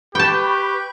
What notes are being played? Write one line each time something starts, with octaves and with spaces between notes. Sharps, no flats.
G4 B4 G5 A5 B5 C#6 G6